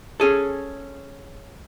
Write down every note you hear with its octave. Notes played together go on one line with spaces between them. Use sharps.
C#4 G#4 A4